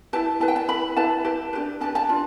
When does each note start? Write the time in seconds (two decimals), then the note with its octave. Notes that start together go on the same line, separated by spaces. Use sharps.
0.13 E4 G4 B4 A5
0.40 E4 B4 A5
0.48 G5
0.56 A5
0.68 B4 B5
0.72 E4
0.96 E4 G4 B4 A5
1.25 E4 G4 B4
1.53 D4 G4 B4
1.80 D4 G4 B4 A5
1.95 A5
2.09 D4 F4